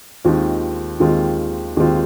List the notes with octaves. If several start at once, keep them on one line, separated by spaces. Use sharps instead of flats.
D#2 D#3 G#3 C4 F4
D#2 D#3 G#3 C4 F4
D#2 D#3 G#3 C4 F4